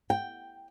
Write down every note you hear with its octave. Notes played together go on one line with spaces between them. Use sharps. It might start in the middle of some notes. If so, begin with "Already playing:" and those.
G5